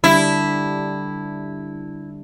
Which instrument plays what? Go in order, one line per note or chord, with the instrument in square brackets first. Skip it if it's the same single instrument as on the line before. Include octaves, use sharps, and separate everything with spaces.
[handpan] D3 G3 D4 [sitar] E4